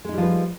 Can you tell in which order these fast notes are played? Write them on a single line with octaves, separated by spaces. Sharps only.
G#3 D#4 G3 F3 B4